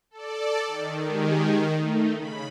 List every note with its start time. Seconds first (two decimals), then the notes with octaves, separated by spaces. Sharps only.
0.11 A4 D5
0.67 D#3
1.06 G#3 G4 G#4
1.76 A3 D#4
2.18 C#3 B5